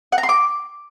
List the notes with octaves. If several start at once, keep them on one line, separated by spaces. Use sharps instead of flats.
F#5
A#5
C6
D6